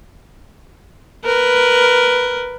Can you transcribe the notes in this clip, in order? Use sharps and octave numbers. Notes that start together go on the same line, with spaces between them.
A#4 B4